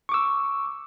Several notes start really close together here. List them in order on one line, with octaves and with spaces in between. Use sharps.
C#6 D6 E6